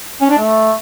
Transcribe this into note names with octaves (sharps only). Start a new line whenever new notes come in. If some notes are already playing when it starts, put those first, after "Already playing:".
C#4
D4
A3